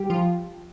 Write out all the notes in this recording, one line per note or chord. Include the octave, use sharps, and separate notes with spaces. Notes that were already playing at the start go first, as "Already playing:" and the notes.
Already playing: G3 G4
F3 F4